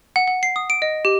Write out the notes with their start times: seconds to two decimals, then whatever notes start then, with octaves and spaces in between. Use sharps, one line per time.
0.16 F#5
0.28 F#5
0.43 C7
0.56 D#6
0.70 D7
0.82 D#5
1.05 G4